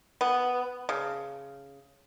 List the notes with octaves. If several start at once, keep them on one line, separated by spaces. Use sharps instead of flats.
B3
C#3